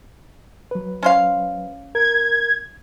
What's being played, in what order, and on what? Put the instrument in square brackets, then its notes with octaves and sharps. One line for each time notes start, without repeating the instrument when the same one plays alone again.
[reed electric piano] F#3 B4
[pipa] C#4 C5 F5
[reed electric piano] A#4 [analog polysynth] G#6